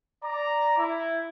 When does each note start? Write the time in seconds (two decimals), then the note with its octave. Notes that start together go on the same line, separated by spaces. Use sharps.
0.23 D5 A#5
0.77 E4